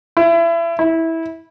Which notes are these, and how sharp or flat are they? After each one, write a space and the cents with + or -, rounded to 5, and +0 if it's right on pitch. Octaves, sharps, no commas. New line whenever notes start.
E4 +30
E4 -15